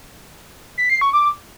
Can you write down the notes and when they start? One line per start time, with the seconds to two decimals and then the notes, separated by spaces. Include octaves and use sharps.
0.78 B6
0.90 C7
1.01 C#6
1.13 D6